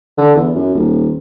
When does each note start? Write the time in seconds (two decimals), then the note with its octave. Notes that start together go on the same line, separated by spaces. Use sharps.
0.18 D3
0.36 E2
0.55 F#2
0.75 D#1